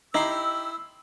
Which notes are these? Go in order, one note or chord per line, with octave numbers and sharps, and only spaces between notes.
D#4 E4 G4 C6 E6